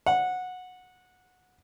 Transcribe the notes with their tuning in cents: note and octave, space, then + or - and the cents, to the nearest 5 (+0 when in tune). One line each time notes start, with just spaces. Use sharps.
F#5 -15